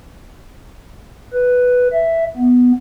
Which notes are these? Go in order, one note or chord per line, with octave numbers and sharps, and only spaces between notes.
B4
E5
B3